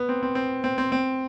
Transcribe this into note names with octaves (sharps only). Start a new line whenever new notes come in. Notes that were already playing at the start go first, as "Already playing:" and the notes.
Already playing: B3
C4
C4
C4
C4
C4
C4